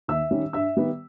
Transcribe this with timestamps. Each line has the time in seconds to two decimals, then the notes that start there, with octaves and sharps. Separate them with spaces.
0.08 D#2 E5 E6
0.31 D#3 G3 C#4
0.53 G2 E5 E6
0.77 D#3 G3 B3